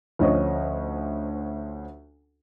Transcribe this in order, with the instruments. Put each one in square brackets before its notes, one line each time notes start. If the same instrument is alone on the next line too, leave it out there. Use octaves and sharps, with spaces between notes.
[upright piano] D2 F3 C#4 D#5